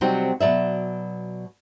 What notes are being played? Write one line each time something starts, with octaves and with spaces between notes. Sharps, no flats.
C3 F#3 G3 C4 D#4 F#4
B2 F#3 D5 E5